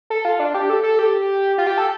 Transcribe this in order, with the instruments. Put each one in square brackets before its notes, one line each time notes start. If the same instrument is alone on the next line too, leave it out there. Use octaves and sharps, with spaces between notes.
[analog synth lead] A4
F4
D4
G4
A4
A4
G4
F4
G4
A4